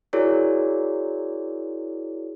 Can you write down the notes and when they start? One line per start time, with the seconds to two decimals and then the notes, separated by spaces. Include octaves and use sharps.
0.13 E4 F#4 G#4 A#4 C#5 D5